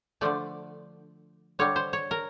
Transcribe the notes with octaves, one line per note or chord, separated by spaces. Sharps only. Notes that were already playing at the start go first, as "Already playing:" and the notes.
D3 F3 A3 D5
D3 G3 C#5
C5
C#5
A#4